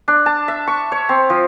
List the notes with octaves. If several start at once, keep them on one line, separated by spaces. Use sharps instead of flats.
D4
A5
E5
C#6
C#5
C4
F3